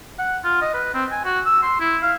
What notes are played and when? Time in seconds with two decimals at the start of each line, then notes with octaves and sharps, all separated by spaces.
0.19 F#5
0.44 F4
0.62 D#5
0.74 B4
0.94 C4
1.12 G#5
1.25 F#4
1.46 E6
1.63 C6
1.80 E4
2.03 F5